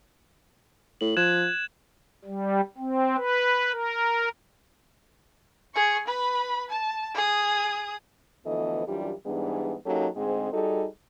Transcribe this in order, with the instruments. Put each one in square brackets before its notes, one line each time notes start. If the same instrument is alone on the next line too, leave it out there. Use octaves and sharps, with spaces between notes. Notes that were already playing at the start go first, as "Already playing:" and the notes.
[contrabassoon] A2 [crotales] F#7
[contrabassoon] F3 [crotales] F#6 G#6 E7
[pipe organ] G3
C4
B4
A#4
[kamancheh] G#4 C#6
B4 B5
A5
G#4 D#6
[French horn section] D2 E3 F3 B3 A4 D#5
F#2 E3 G3 D4 F4 G4
G#2 E3 G3 B3 D4 G#4
F#3 A#3 C#4 D#4 G4 A4
D2 G#2 G#3 C4 G#4
G3 D#4 F#4 G#4 A4